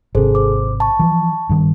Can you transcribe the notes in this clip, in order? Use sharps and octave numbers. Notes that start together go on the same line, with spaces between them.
G#1 C3 G#4 A4 C5
C5 D6
A5 C#6
E3 F3
G2 D#3